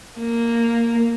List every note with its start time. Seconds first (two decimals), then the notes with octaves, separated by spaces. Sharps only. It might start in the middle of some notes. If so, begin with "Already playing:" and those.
0.19 A#3